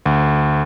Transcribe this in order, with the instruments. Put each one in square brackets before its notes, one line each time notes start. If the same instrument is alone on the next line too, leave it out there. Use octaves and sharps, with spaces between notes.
[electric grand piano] D2